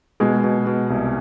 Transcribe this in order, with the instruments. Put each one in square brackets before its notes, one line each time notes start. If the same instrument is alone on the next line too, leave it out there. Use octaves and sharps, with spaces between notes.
[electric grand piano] B2 [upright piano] G#3
[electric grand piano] B2
B2
C2